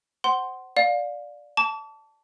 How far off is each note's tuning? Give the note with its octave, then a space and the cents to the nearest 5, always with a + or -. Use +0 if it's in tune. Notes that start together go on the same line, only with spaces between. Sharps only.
C5 +0 F#5 +25 C6 +0
D5 +0 F5 +25
A5 +0 D6 -45